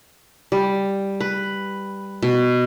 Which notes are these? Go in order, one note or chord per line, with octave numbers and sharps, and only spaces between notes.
G3
B4
B2